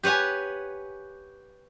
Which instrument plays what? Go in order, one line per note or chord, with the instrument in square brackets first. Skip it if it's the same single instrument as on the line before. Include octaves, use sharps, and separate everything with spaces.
[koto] G4 B4 C#5 F#5 G#5